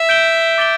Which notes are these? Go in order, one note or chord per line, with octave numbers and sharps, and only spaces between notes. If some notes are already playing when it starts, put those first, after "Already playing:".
Already playing: E5
G6 D7 G7
D6 A6 D7 G7